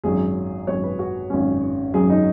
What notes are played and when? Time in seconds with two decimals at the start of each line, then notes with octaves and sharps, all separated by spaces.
0.04 G#1 F#2 F#3 G#4
0.67 G#1 F#2 F#3 C#5
0.83 B4
0.99 F#4
1.30 G#1 F#2 F#3 C#4
1.94 G#1 F#2 F#3 G#4
2.10 D#4